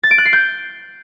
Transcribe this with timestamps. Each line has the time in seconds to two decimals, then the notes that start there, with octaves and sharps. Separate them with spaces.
0.03 A6
0.11 D7
0.18 F#6
0.25 C7
0.33 G6